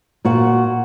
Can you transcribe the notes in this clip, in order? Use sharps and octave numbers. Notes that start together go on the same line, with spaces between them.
A#2 F#4 F#5